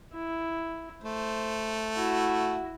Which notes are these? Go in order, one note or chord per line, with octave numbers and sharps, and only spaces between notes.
E4
A3 C5
E4 F#4